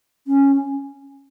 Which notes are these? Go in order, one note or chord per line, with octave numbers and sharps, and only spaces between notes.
C#4